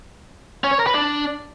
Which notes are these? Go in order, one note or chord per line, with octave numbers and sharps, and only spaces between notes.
C#4
C#5
A#4
B4
D4